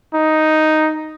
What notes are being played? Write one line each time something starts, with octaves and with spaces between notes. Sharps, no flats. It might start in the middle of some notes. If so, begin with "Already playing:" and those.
D#4